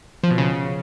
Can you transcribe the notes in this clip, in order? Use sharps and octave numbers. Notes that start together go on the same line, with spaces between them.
F3
B2
C#3